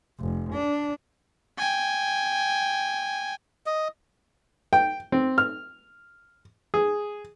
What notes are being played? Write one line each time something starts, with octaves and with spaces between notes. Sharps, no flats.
F1
D4
G5 G#5
D#5
G5
C4
F6
G#4